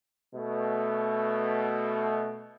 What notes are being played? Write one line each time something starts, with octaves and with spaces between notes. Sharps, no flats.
B2 A3